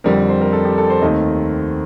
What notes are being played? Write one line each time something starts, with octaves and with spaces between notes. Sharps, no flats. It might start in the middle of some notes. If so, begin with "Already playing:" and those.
F2 D3 G3 C4 A#4
C5
A#4
A4
G4
A4
C5
D#2 D#3 A3 C4 D#5